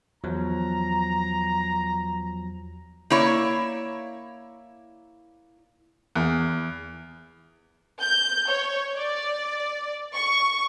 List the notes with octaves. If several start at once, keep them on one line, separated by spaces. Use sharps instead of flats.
E2 F3 F#3 A#5
A#3 E4 C#5 D5
E2
G6
C#5
D5
C#6